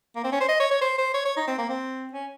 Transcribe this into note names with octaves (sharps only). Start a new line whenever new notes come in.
A#3
C4
C#4
C5
D#5
C#5
C#5
C5
C5
C#5
C#5
D#4
C4
A#3
C4
C#4